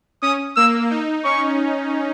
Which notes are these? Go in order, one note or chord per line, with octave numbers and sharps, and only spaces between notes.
C#4 D#6
A#3 E6
D#4
C#4 C#6